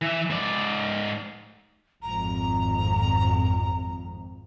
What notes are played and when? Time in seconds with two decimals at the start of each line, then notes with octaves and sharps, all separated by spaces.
0.02 E3 E5
0.30 G#2 D5
2.02 G#1 F2 A#5